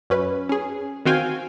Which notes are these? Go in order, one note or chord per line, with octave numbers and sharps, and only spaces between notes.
F#2 C#4 B4
C#4 G#4
D#3 C4 F#4 F5 G5 G#5